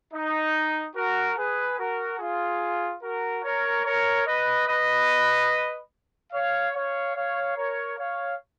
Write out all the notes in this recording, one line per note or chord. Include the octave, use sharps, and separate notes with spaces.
D#4
F#4 A#4
G#4 B4
F#4 A#4
F4 G#4
F#4 A#4
A#4 C#5
A#4 C#5
B4 D#5
B4 D#5
C#5 F5
C#5 F5
C#5 F5
A#4 C#5
C#5 F5